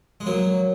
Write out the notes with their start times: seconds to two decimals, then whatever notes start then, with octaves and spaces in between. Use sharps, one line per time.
0.20 G#3
0.26 F#3 A#3